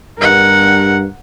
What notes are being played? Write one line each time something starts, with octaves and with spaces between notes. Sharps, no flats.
G2 A#4 F#5